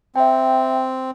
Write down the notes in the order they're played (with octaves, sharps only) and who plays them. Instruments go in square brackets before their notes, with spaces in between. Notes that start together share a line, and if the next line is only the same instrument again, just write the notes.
[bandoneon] C4 [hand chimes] E5 G5